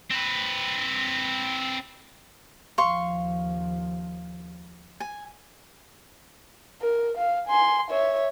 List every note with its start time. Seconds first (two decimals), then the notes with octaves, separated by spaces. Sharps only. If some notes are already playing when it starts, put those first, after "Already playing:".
0.11 C4 B4
2.78 D#2 F3 F5 C6 C#6
5.00 G#5
6.82 A#4
7.17 F5
7.48 G#5 C6
7.90 C#5 E5